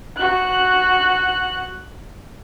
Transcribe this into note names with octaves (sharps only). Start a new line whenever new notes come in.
F#4 F#6